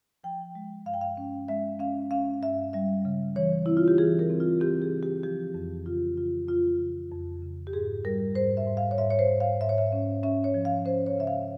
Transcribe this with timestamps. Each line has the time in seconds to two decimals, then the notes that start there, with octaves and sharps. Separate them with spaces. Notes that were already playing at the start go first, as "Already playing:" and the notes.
0.24 F3 G5
0.55 G#3
0.86 G2 F5
0.94 G5
1.01 F5
1.17 C#4
1.48 G#3 E5
1.79 C#4 F5
2.11 C#4 F5
2.42 G2 E5
2.73 G3 E5
3.05 C#3
3.36 E3 C#5
3.66 C4 E4
3.77 F4
3.88 G4
3.98 E3 G#4
4.19 A#4
4.30 C4
4.40 F4
4.60 C4 G4
4.82 G#4
4.92 C#3
5.03 G4
5.23 F3 G4
5.55 F2
5.86 C#3 F4
6.17 C#3 F4
6.48 F2 F4
6.80 C#3
7.11 F2
7.42 C#3
7.67 G4
7.73 G#2 G#4
8.05 G3 A#4
8.35 G#2 C5
8.57 E5
8.67 G#2
8.77 F5
8.91 C#5
8.98 G#2 E5
9.10 C#5
9.19 C5
9.29 G#2
9.40 F5
9.61 G#2 E5
9.69 C#5
9.78 E5
9.93 C#4
10.23 C#4 E5
10.44 C#5
10.54 F3
10.65 F5
10.85 C#4 C5
11.06 C#5
11.17 C#3 E5
11.27 F5